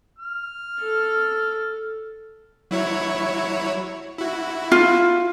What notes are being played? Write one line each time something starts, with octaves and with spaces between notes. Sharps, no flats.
F6
A4
F#3 E4 C#5
E4 F#4
F4